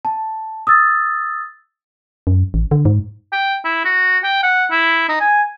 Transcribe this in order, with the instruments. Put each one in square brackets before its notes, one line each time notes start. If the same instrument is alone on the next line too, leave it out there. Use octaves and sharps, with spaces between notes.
[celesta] A5
D#6 E6 A6
[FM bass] F#2
A1
D3
G#2
[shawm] G5
E4
F#4
G5
F#5
E4
D#4
G#5